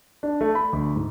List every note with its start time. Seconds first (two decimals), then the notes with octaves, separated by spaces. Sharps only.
0.23 D4
0.41 A3
0.55 B5
0.73 D2
0.96 G#2